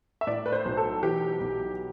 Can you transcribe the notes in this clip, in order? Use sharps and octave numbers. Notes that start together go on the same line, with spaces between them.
E5
A2 D5
B4
C5
B1
A4
E3 G4
B1